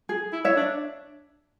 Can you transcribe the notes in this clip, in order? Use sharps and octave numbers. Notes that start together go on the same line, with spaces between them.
G#4
E4
C#5 E5
D4